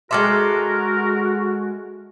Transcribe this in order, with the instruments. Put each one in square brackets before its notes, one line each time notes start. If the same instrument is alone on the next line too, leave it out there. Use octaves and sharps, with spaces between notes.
[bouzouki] G#3 A4 E5 [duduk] F#4 [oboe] A#4 [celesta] C6 D6 F6